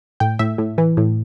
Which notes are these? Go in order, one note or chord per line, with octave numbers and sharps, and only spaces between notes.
A2 G5
A2 E5
A2
E3
A2